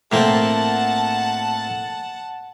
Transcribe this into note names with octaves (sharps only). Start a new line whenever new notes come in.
A2 A#3 C4 F#5 A5